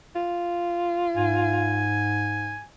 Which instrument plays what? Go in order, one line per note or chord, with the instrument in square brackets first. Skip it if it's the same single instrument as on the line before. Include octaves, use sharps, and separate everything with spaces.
[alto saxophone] F4
[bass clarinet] G#2 [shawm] G#5